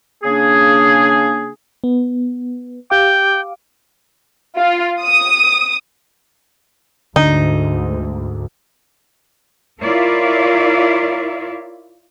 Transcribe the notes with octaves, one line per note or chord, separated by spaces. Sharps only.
C#3 A#3 D4 G#4
B3
G4 F5 G5 D6
F4
D#6
D2 G#2 D3 D#4
E4 F4 A#4 C#5 D5 E5